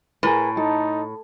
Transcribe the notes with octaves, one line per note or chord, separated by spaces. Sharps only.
A2 G#4 A#4 B4
D#4 A4